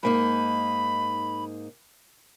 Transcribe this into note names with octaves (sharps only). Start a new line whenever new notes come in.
G#2 A#3 D#4 B5